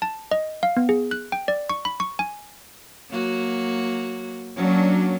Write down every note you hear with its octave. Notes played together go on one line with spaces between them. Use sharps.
A5
D#5
F5
B3
G#4
F#6
G5
D5
C#6
B5
C#6
G#5
F#3 A#3 F#4
F#3 A#3 C#4 D4